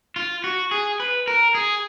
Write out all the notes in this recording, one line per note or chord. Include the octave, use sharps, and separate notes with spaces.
F4
F#4
G#4
B4
A#4
G#4